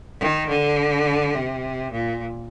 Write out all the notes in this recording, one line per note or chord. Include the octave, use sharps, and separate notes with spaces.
D#3
D3
C3
A#2